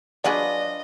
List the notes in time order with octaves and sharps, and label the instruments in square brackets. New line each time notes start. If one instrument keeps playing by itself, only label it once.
[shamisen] F#3 F#4 G#4 [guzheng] D4 F4 B4 [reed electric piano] D5 [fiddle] D#5